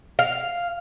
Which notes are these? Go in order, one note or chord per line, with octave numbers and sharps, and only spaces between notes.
F5